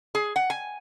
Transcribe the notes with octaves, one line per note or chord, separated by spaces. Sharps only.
G#4
F#5
G#5